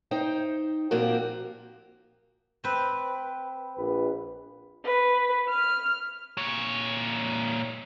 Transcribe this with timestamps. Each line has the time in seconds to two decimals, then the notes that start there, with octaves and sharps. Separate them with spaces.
0.11 D#4 C5 G5
0.91 A#2 F3 A#3 C4 F#4 G4
2.64 C4 B4
3.76 A#1 B4
4.85 B4
5.49 F6
6.37 A#2 C#5